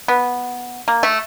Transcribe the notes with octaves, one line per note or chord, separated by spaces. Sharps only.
B3
A#3
A3